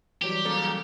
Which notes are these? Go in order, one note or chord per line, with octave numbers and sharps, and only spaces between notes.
E3 F#3 G3 G4
C#3 A#3 A4